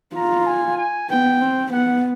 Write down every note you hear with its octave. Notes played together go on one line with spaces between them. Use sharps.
F4 A#5
G#5
G#5
B3 G5
C4
B3 F#5